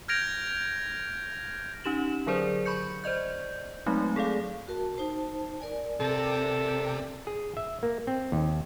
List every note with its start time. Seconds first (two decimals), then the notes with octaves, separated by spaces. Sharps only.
0.08 F6 G6 G#6 A#6 D7 F7
1.84 C#4 D#4 G4 E7 F#7
2.27 D3 F#3 G#4 A#4 C5 D5
2.65 B5 C#6 G6 C#7
3.04 C5 D5 D#5 G6
3.86 F#3 G#3 A3 C4 D#4
4.16 G#4 A4 D5 F5
4.68 F#4 A#4 A5
4.97 D#4 C5 A5
5.60 A#4 D5 G#5
6.00 C3 A4
7.27 G#4
7.57 E5
7.83 A#3
8.07 C4
8.32 D#2